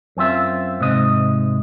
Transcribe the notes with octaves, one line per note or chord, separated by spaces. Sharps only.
F#2 C4 F4 E5
G#2 C3 D#5